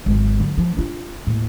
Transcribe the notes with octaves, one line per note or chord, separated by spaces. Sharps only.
G#1 F#3
D3 F#3
F3
D4 F4
D#2 A2